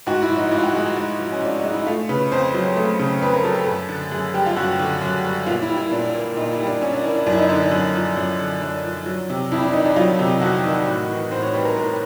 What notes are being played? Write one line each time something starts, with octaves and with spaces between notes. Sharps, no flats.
G#2 F#4
E4
F3
D#4
G#2 E4
F4
F#4
G#3 G#4
F#4
G#2
F3
C#4
G#2 D4
G#3 D#4
E4
A3 F4
C#3 B4
F2 C5
F#3
A3
C#3
F2 B4
A#4
F#3 A4
A4
F#2
D3
F#2 G#4
G3 G4
F4
F#2 F#4
D3
F#2
G3
A#2 F4
E4
G3
E4
A#2 D4
A#3
A#2 D#4
E4
G3
D4
A#2 C#4
D4
A#3 E4
D4
F#2 D4
E4
D#4
D3 D4
D#4
F#2
F3
F#2
D3
F#2 D4
F3
F#3
C3
F2 E4
D4
D#3 D#4
D4
F#3 F4
C3
F2 F#4
D#3
A2
E3
A2 C5
C#5
G3 B4
A#4
A2 A#4